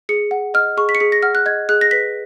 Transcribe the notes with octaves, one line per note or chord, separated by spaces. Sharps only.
G#4 C#7
F#5
D#5 F6
G#4 C#6
B6
C#7
G#4 B6
A#6
F#5 F6
F#6
D#5 G#6
G#4 F#6
A#6
B4 B6